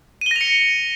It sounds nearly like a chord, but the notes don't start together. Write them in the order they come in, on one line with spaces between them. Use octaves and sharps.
D#7 G7 A#6 F7 C#7